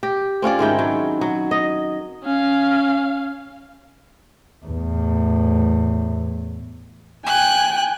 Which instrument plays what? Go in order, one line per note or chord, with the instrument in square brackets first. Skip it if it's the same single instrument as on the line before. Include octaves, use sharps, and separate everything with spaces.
[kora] G4
C4 C#4 F4 D5
G#2 D#3 E4 G5
F#3
F#3
D#5
[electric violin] C#4 F5
[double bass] E2 A2
[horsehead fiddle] G5 G#5 [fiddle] F#6